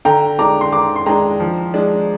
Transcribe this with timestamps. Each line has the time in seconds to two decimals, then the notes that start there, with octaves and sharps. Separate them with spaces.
0.05 D3 G5 A#5
0.39 G#3 D4 A#5 D6
0.61 C6
0.72 D3 A#5 D6
0.96 C6
1.06 G#3 D4 G5 A#5
1.40 F3
1.74 G#3 D4